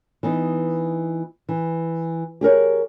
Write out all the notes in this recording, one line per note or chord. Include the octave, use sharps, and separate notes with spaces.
E3 B3 D#4
E3
G4 G#4 A#4 C#5